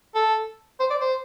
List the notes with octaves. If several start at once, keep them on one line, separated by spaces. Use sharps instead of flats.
A4
C5
D5
C5